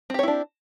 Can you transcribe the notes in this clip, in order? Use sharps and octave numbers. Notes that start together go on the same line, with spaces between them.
C4 D4 E4 G4 C#5